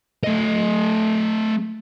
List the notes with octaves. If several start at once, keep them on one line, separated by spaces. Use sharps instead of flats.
A3 D#5